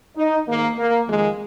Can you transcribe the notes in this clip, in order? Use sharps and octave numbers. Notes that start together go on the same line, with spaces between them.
D#4
G#2 D#3 A#3
A#3
F2 D#3 G#3